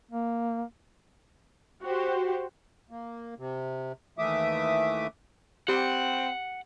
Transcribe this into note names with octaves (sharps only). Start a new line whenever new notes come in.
A#3
F#4 G4 C5
A#3
C3
D#2 E3 A3 E5 D6 D#6
C4 G4 F#5